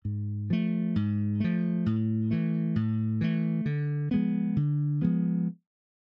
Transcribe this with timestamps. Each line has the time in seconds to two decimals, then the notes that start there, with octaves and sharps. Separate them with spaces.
0.05 G#2
0.50 F3 A3
0.96 G#2
1.40 F3 A3
1.86 A2
2.31 E3 A3
2.76 A2
3.21 E3 A3
3.66 D3
4.11 F3 G#3 B3
4.56 D3
5.02 F3 G#3 B3